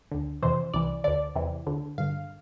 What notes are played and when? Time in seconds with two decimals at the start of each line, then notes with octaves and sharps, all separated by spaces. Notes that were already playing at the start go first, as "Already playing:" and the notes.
0.12 D2 D3
0.42 F2 C3 E3 C5
0.74 C2 C3 E3 D5
1.04 D2 D3 D5
1.36 E2 C3 E3
1.66 D2 D3
1.98 G2 D3 F5